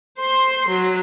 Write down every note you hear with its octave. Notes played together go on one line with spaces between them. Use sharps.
C5 C6
F#3